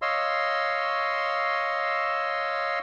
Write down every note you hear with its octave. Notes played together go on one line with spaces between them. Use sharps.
C#5 D#5 F5 C6 E6